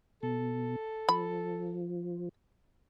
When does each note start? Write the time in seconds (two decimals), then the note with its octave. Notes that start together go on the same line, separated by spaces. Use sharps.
0.23 B2 A4
1.09 F3 B5